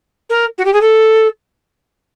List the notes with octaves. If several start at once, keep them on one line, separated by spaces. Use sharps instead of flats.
A#4
F#4
G4
G#4
A4